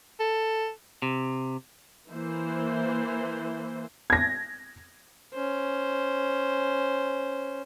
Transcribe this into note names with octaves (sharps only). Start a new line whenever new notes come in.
A4
C3
E3 A#3 C5
G#6 A#6
C#4 C5